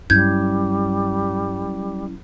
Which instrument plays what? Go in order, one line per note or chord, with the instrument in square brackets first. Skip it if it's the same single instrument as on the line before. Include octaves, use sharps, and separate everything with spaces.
[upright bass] G2 [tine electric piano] F#3 C#4 E4 [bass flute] G3 [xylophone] G6 G#6